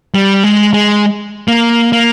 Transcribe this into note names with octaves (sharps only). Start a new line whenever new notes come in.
G3
G#3
G#3
A#3
A#3